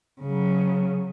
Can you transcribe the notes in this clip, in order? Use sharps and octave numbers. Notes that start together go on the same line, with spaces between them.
C#3 F#3